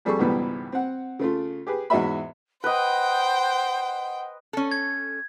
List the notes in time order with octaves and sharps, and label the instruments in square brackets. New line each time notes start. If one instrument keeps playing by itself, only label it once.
[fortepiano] F2 G3 G#4 A4 C#6
C#2 G#2 B2 E3 G3 B3
C4 F#5
C#3 A3 F4
G4 G#4 B4
E2 G#2 F#4 D#5 E5 B5
[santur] B4 D#5 [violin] C5 G5 [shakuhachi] F#5
[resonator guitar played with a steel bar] C#4 A4
[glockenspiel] G#6